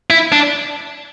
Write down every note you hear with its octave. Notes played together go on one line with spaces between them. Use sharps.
E4
D4